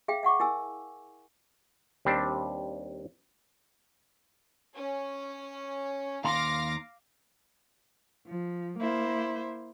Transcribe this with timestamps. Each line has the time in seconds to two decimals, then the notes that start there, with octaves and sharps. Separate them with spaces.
0.08 G#4 E5 F5 G5
0.23 E5 F#5 C#6 D6
0.40 E4 A#4 G#5 E6
2.05 D#2 G3 C4 D4
4.75 C#4
6.25 D#2 F5 A#5 C6 D6 A#6
8.27 F3
8.78 A#3 E4 C5